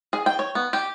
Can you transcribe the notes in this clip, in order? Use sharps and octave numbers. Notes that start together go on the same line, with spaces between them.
G#4
G5
C#5
B3
G4